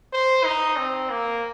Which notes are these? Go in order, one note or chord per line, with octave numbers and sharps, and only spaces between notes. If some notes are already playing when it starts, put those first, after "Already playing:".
C5
D#4
C4
A#3